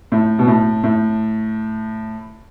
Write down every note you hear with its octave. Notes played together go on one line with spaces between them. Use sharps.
A2
B2
A2
A2